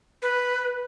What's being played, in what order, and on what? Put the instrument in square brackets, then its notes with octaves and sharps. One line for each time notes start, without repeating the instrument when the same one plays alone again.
[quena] B4